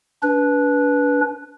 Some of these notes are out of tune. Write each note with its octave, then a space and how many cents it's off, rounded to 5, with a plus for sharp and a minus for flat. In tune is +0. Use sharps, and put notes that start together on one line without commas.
D4 -35 B4 -10